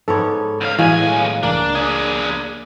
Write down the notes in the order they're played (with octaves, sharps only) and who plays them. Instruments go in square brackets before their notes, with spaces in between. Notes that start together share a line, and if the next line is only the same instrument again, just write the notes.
[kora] G#2 B3 C#5 [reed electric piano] A4
[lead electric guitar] C#2 F5
[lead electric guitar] B1 G#5 [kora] A2 G#3 F#4 [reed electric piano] E3 F5
[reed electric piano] C#2 [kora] A#3 [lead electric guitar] D4
[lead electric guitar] D4 G#4